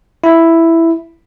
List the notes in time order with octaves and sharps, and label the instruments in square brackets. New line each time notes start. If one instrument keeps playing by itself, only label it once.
[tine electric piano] E4